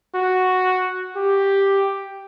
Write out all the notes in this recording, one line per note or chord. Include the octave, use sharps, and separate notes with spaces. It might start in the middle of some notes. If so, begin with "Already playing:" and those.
F#4
G4